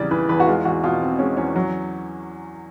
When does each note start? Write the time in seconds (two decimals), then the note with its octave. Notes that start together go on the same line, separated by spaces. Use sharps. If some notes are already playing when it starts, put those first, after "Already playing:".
Already playing: E2 C#3 E3 G3 D5
0.11 E3 B4
0.29 E2 B4
0.40 F#4
0.47 G#3 F4
0.65 E2 F#4
0.83 B2 F4
1.02 C4
1.19 G#3 C#4
1.37 E2 C#4
1.56 F#3